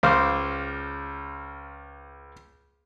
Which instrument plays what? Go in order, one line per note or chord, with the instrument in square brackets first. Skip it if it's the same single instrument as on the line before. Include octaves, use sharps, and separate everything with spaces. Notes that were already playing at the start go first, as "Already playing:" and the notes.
[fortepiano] C#2 C5 F5 D6